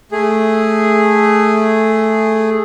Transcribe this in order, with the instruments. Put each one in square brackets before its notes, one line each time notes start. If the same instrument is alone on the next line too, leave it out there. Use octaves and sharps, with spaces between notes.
[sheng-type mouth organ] A3 G#4